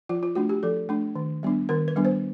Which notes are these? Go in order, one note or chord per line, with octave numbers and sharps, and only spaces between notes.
F3 F4
F4
A3 D4 F#4
G4
F3 A4
A3 D4
D#3
G3 B3 D4
D#3 A#4
B4
G3 B3 D4
C5